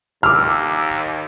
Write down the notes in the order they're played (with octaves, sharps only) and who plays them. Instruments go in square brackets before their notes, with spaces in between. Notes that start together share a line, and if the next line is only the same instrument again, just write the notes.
[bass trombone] D#2 [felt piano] D6 E6 [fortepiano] F6